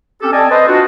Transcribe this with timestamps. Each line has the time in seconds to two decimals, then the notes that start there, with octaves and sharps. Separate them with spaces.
0.22 C4 C#4 G4 A4
0.33 C4 A4 D5 D#5 G#5 A5
0.51 B4 C5 D#5
0.67 D4 F4 F#4